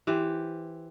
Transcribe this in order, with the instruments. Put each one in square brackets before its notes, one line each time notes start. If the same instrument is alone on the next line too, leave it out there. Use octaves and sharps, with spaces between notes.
[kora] E3 G4 C5